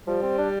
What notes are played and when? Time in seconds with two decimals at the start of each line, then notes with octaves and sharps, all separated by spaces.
0.07 F3 G3
0.22 C4
0.38 D4